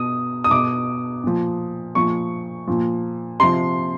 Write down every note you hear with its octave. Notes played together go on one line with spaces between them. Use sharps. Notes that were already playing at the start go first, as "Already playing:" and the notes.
Already playing: B2 D#6
D#6
B2 D6
A#2 F3
A#2 F3 C#6
A#2 F3
C3 F3 C6